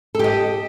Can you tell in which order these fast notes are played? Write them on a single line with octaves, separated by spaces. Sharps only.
A4 G4 D#5